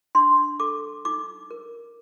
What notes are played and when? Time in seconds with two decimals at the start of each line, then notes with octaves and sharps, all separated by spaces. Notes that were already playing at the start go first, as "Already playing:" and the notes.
0.15 D4 C6
0.60 A4 D6
1.05 D#4 D6
1.51 A#4